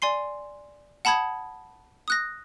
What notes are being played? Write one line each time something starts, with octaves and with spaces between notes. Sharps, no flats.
D5 G#5 C6 C7
F#5 A5 B5 D#6 G#6
D#6 F#6 A#6